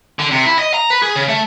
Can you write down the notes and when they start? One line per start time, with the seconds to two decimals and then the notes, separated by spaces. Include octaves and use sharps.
0.19 D3
0.31 C3
0.45 E4
0.59 D#5
0.74 A#5
0.90 B4
1.02 G#4
1.16 C#3
1.28 A3